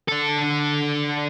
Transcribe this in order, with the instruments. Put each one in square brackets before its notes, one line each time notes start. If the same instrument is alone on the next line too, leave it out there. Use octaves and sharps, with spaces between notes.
[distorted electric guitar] D3 A4